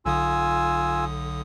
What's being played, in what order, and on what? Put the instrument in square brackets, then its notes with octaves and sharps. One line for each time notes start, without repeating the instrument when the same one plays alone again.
[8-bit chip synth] B1 D3 D#6 [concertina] F4 G#5 E6